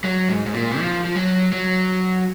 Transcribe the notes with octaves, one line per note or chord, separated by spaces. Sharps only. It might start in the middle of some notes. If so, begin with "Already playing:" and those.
F#3
G#2
G#2
A#2
F3
F3
F#3
F#3